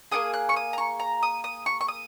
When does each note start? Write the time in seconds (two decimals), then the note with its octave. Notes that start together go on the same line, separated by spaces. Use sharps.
0.11 A#3 C#4 G#4 D#6
0.34 F#6
0.49 C#6
0.56 D#6
0.73 A#5
0.78 C#6
1.00 A#5
1.23 D#6
1.44 D#6
1.66 C#6
1.81 C#6
1.88 D#6